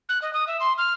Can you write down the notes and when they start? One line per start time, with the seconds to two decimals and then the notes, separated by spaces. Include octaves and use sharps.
0.09 F#6
0.22 D#5
0.33 D#6
0.47 E5
0.60 C6
0.78 F6